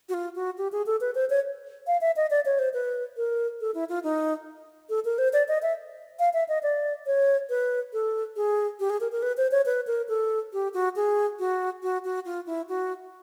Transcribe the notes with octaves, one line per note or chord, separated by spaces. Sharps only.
F#4
F4
F#4
G4
G#4
A4
B4
C5
C#5
F5
E5
D#5
D5
C#5
C5
B4
A#4
A4
E4
F4
D#4
A4
A#4
C5
D5
D#5
E5
F5
E5
D#5
D5
C#5
B4
A4
G#4
G4
G#4
A#4
A#4
B4
C5
C#5
B4
A#4
A4
G4
F#4
G#4
F#4
F#4
F#4
F4
E4
F#4